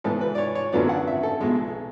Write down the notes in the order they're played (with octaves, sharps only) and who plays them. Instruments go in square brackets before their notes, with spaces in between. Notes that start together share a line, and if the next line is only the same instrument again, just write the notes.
[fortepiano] G#2 E3 B3 A4
B4
D5
C#5
C#5
G#1 F#2 D3 F#3 B3 D5
F#5
E5
A4
B1 B2 G#3